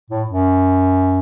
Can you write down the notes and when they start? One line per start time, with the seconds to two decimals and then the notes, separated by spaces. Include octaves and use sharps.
0.10 A2
0.27 F#2